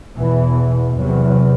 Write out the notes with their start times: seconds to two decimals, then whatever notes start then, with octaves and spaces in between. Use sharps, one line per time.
0.17 E2 B2 E3
0.98 E2 C3 F#3